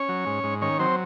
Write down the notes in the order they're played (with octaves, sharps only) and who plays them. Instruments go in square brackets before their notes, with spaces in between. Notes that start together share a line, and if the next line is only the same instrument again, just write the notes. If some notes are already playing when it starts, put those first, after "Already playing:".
Already playing: [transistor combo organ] C#4 C#5
F#3
G#2
G#2
D#3 C#4 C#5
F#3 C4 C5